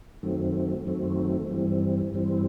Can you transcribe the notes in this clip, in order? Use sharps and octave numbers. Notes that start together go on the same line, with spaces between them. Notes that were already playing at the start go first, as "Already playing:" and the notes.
F#2 D#3 F#3 A3 C4
F#2 D#3 F#3 A3 C4
G2 E3 G3 C4
G2 E3 G3 C4